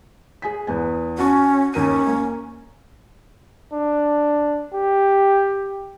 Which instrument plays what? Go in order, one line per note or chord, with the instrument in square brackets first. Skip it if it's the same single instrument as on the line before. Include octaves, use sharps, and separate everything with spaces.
[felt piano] G#4 G#5 B6
E2 B3 G#5
[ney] C#4 [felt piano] F#4 A5 C#6
[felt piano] D#2 A#4 D#7 [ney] C#4
[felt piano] A#3
[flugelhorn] D4
G4